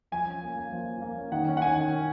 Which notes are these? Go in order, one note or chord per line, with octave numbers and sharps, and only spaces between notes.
F3 G#5
C#4
A#3
A#3
F3
F3
A#3
C#4
D#3 F#5
C#4
F#5
D#3 G#5
D#3
C#4